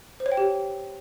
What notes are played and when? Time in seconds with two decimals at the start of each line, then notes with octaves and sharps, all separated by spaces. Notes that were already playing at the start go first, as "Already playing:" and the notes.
0.20 C5
0.26 C#5
0.32 G5
0.37 G4